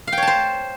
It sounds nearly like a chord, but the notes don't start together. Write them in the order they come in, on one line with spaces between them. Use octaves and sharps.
F5 G5 C#5 A5 C5